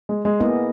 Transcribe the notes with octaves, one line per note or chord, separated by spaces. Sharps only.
G#3
G#3
A#3 B3 E4 G#4 D#5